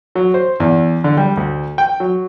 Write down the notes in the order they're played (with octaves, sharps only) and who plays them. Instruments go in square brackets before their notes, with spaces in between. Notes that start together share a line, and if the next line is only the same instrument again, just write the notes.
[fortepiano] F#3
C5
E2
D3
G3
D2
G5
F#3